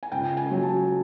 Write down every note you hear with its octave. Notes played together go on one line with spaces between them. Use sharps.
G#5
C#2 G5
G#5
F#3
A5